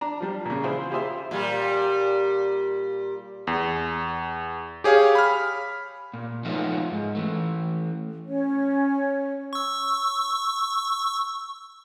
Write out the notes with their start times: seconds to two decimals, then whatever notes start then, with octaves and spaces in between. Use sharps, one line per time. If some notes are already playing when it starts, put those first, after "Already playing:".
0.01 D4 A#5
0.20 F3 G3 D4
0.45 A#2 C#3
0.64 E3 E4 F4 G#4 C5
0.91 F4 G4 G#4 C5 E5
1.31 A#2 G3
3.47 E2
4.84 G4 G#4 C#5 F5 G#5
5.15 B5 F6
6.14 A#2
6.45 F3 F#3 A3 B3 D#4 F4
6.91 G#2
7.15 E3 A3
8.27 C#4 C#5
9.53 C#6 E6